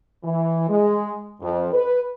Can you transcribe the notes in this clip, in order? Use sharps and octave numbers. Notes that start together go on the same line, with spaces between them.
E3
G#3
F2
B4